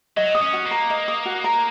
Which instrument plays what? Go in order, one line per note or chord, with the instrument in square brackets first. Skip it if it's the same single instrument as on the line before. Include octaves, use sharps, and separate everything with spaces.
[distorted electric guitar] F#3 [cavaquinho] D#5
[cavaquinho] D#6
[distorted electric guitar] C#4
[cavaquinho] F#4
[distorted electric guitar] A#3
[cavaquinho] A#5
D#5
D#6
F#4
A#5